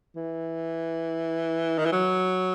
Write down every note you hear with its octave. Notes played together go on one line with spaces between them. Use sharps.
E3
D#3
E3
F#3